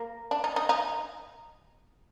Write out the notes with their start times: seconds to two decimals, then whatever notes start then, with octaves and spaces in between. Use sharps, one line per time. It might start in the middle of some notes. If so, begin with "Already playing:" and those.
Already playing: A#3
0.31 D4
0.44 D#4
0.56 D#4
0.69 D#4